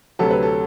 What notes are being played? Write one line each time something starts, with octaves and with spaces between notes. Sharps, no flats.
D2 C3 F#3 A4
B4
A4